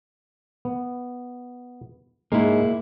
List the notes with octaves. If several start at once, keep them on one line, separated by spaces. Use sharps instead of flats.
B3
G#2 G#3 A#3 E4 A#5